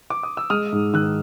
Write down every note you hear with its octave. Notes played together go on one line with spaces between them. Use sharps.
D6
D#6
E6
G#3 D#6 F6
G#2
D#3 E6 F#6